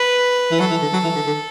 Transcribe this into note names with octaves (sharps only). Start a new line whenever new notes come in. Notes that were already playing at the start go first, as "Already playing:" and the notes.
Already playing: B4
E3
F#3 A4
E3
D3
F#3
E3
D3
D3